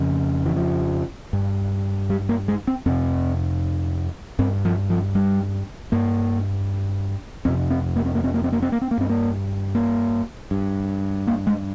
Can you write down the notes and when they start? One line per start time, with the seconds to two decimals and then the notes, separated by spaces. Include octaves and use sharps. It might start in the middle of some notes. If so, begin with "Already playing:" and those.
Already playing: F2 C#3
0.46 E3
0.56 F3
1.33 G2
2.10 G3
2.29 A#3
2.48 G#3
2.67 C4
2.86 F2 C3 C4
4.39 G2 C4
4.65 F3
4.90 F3
5.15 G3
5.92 G2 A#3
7.45 F2 C3 C4
7.70 C4
7.96 A#3
8.06 C4
8.15 A#3
8.24 C4
8.34 A#3
8.44 C4
8.52 A#3
8.62 C4
8.72 A#3
8.82 C4
8.91 A#3
8.98 G2 C4
9.10 A#3
9.75 A#3
10.51 G2
11.27 A#3
11.47 G#3